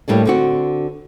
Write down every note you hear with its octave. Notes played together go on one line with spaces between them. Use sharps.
A2 G3 A#3 D4
D3 C4 F#4